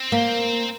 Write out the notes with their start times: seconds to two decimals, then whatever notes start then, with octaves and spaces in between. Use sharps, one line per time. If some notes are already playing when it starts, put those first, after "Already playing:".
Already playing: C4
0.12 A#3